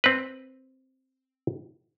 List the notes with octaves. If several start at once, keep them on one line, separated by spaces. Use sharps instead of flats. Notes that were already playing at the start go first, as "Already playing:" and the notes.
C4 B4